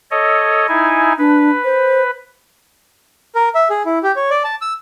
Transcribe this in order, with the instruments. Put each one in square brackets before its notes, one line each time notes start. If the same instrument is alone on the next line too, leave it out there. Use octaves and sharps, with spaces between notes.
[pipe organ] A4 C#5 D#5
D#4 E4 G#5
[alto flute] D4 [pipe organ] B4
[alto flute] C5
[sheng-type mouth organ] A#4
E5
G#4
E4
G4
C#5
D5
A5
E6